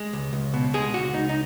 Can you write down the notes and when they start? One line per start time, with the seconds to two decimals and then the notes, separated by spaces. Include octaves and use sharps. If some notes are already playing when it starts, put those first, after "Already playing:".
Already playing: G#3
0.13 C#2
0.33 C#2
0.54 B2
0.74 G#3 G#4
0.94 C#2 F#4
1.14 C#2 D#4
1.29 D#4